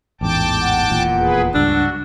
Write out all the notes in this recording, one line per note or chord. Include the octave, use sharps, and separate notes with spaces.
A1 E2 G#2 G5 A5 D6
F#5
D#1 E2 A#2
G#4 B4
C#2 G2 D4 F#4 E6